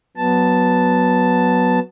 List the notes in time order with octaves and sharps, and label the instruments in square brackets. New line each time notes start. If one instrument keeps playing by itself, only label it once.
[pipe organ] F#3 B3 A5